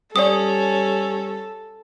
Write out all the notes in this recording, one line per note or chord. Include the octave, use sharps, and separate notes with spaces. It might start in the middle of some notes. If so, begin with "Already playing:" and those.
G3 C#4 A4 D5 D#6